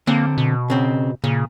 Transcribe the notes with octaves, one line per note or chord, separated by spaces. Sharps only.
D3 A#3 C4
B2
C#3 C4
A#2 C#3